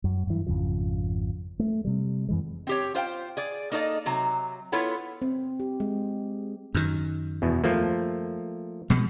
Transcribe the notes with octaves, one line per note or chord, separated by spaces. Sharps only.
F#2
G2 E3
G#1 F2 C#3 F3
A3
C3 G3
F#2 E3 G#3
C4 G4 C#5
F4 C5 F5 G5
G#4 D5
A#3 D#4 A4 C5 D5 D#5
C3 F#3 A#5
B3 E4 F4 A4 C#5
C4
G4
G#3
F#2 D#3
E2 B2
F3 A3 A#3
B2 F3 G#3